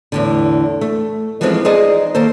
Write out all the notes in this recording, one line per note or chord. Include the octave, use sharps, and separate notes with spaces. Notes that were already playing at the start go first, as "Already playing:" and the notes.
E2 A2 D3
A3
E3 F3 G#3 B3 C4 D#4
D#4 G#4 C5 D5 D#5
D#3 A#3 A4 C5